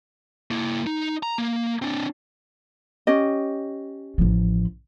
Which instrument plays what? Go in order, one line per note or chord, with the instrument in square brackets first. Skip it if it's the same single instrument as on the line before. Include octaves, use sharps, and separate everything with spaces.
[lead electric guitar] A#3 E4
D#4
A#5
A#3
C4 D4
[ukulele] C#4 G4 D#5
[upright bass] A1 F3